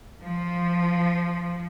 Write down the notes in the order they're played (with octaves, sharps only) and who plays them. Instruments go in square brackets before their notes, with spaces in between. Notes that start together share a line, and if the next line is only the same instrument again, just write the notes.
[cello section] F3